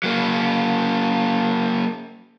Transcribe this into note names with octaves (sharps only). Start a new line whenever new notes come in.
F#3 A#3